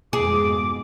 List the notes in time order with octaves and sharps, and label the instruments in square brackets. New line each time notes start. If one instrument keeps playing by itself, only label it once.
[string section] F2 G#2 B2 [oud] G#4 [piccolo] D6